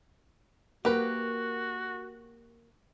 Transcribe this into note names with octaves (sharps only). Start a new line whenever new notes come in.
A#3 F#4 G4 A#4 B4 F#5